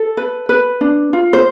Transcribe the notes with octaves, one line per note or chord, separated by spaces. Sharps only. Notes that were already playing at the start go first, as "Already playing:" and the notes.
Already playing: A4
B4
B4
D4
F4
C5